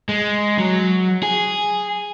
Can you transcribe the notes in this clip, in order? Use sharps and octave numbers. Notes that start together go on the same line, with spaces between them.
G#3
F#3
G#4